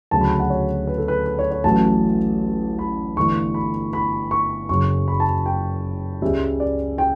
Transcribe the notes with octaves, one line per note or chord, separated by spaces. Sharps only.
D2 C#3 F#3 C#4 A5
B5
A5
F#5
C#5
B4
A4
B4
B4
C#5
C#5
A1 A2 F#3 A3 C#4 A5
B5
G1 G2 E3 A3 D4 C#6
B5
B5
C#6
F#1 F#2 C#3 F#3 C#4 C#6
B5
A5
G5
C#2 C#3 G3 C#4 E5
D5
G5